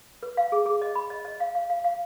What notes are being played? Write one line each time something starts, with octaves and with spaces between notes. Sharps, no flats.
B4
F5
G#4
G#4
D#5
B5
D#5
D#5
F5
F5
F5
F5